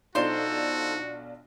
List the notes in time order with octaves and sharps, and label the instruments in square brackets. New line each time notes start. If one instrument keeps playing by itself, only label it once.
[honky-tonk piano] B1 D4 F4 [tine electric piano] D#4 [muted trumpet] F#4 [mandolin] A4 C5 C6